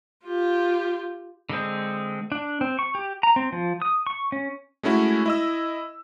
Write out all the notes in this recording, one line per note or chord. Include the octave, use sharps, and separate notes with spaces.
F4 G4
D3 G#3 C4
D4
C4
C#6
G4
A#5
C4
F3
D#6
C#6
C#4
G#3 A3 C#4 E4 F#4
E4 D#5 E6